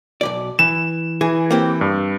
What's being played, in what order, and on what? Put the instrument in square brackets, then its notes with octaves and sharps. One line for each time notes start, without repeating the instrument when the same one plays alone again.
[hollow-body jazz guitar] B1 G#2 D5
[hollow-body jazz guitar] E3 [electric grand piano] E7
[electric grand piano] E3 [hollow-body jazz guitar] G#4
[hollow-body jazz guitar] A#3 C4 G4
[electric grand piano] G2